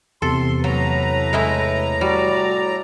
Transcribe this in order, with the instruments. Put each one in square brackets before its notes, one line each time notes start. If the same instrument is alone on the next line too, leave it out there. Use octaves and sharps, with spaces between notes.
[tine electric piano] E2 C3 [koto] A4 [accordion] C6
[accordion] A2 A#5 [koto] F#3 [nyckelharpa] B4
[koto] G#3 A3 E4
[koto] G3 [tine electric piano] F#4 [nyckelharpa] D5